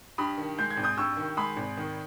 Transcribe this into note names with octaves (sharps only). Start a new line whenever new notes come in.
G2 B5 D#6
D#3
G#3 G6
G#6
G#1
D#6 G6
G2 C#6 E6
D#3
G#3 B5 D#6
G#1
D#3